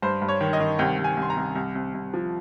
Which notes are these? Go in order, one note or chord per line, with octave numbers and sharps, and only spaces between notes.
G2 C5
G2
C#5
D#3
D#5
D#3
C2 G5
C2
G#5
C2 C6
A#5
C2
C2
C2
C2
F3